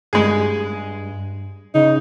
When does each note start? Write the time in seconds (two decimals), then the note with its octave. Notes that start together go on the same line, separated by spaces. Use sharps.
0.13 G2 G#3 G#4
1.75 C#3 D#4